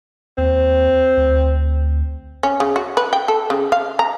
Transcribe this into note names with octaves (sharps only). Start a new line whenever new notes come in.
D#2 C4
D2
C#4
C#3
F#4
B4
G5
A4
C#3
F5
A#5